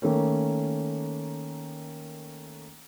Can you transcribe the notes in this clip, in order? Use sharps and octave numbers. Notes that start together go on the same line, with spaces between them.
D#3 A3 A#3 C#4